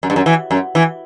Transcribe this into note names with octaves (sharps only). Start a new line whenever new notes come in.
F#2
G2
F#2
E3
F#2
E3